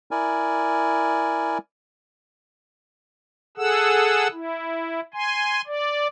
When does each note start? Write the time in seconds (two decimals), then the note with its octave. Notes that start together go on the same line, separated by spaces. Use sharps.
0.11 E4 A#4 D5 G#5
3.58 G#4 A4 F#5 E6
4.33 E4
5.14 G#5 C6
5.67 D5